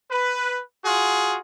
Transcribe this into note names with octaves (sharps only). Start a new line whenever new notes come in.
B4
F4 F#4 G#4